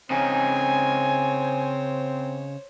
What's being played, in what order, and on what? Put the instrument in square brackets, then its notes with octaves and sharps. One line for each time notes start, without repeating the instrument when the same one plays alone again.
[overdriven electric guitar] C#3 D#4 [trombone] C4 [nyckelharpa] C5 C#5 [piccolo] G#5